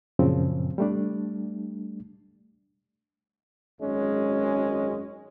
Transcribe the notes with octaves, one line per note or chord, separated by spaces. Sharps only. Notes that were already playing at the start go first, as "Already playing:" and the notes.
F#2 A#2 C#3 F3 C4
G3 A3 D4
G#1 F#2 G#3 C#4